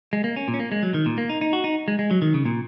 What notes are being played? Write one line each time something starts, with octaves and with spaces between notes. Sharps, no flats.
G#3
A#3
C#4
A#2
C#4
A#3
G#3
F#3
D#3
A#2
A#3
D#4
D#4
F#4
D#4
G#3
G#3
F#3
D#3
C#3
A#2